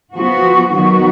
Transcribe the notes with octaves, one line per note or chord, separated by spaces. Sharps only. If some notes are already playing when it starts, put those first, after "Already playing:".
F3 B3 F#4
D#3 F#3 B3 F#4